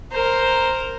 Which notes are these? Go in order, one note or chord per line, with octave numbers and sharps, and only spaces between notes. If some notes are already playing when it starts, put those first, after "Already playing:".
A#4 C5